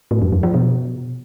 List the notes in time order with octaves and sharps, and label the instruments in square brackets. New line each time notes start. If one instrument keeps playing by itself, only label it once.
[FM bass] A2
F2
F#2
F3
B2